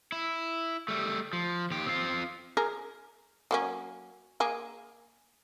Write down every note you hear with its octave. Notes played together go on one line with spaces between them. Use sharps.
E4
G3 A3
F3
D#2 G4
C4 F4
G#4 A#4
F#3 A#3 C#4
A#3 G#4